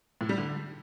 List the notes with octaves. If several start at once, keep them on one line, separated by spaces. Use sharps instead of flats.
A2
G3
D3